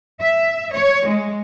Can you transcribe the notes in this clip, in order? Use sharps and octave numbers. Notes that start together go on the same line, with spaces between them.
E5
C#5
G#3